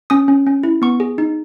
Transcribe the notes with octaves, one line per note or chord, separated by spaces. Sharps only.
C#4 D#6
C#4
C#4
E4
B3 C#6
G#4
D#4